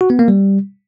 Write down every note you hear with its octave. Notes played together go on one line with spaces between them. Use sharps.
F#4
B3
A#3
G3